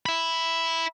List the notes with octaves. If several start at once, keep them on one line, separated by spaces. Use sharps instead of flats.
E5 B5